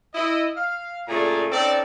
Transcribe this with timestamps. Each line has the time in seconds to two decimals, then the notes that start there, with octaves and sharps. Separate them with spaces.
0.14 E4 D#5
0.56 F5
1.08 A#2 C#3 A3 D5 G#5 A#5
1.52 C4 C#4 D#4 A4 D5